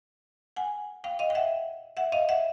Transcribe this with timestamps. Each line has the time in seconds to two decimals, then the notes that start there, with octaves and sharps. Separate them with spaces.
0.56 F#5 G#5
1.04 F5 G5
1.19 D#5 F5
1.30 G5
1.35 E5 F#5
1.97 E5 F#5
2.12 D#5 F5
2.29 E5 F#5